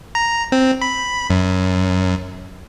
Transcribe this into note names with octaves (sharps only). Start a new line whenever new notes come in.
A#5
C4
B5
F#2